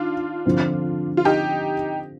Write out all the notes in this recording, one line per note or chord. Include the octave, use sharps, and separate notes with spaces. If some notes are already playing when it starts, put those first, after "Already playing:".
Already playing: D#3 D4 F4
D3 F3 C4
F4
D#4 G4